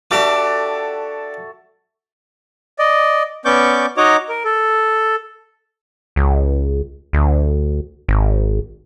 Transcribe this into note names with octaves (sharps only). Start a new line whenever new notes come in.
D4 F#4 G4 A4 E5
D5 D#5
B3 C#4 D5 C#6 D6 G6
D#4 F#4 C#5 D#5 A#5 D6
A#4
A4
C#2
D2
G#1